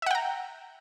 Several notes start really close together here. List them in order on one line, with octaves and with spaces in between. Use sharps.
E5 F#5 G5 A#5